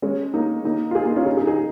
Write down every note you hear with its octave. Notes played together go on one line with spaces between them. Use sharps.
G#3 C#4
A#3 D#4
A#3 D#4
F4
D#4 G#4
A#3 D#4
C#4 F4
D#4 G#4
D#4 G#4
D#4 G#4